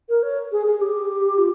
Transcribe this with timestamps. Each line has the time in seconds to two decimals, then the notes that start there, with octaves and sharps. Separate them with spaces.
0.09 A#4
0.22 C#5
0.52 G#4
0.66 G#4
0.81 G4
1.38 F4